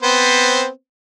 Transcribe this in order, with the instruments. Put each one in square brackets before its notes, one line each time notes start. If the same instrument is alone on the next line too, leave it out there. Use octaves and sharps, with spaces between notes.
[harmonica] B3 C4 C5